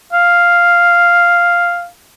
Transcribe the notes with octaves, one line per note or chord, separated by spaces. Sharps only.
F5